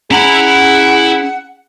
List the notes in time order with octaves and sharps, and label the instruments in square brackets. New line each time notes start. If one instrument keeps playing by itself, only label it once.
[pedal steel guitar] C#4 A#5 [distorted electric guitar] E4 B5 [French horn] G#4 [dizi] F#5